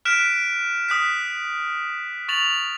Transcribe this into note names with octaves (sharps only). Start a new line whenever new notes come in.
F6 F#6 B6 D7 E7
D#6 F#6 B6
C#6 A6 F7 F#7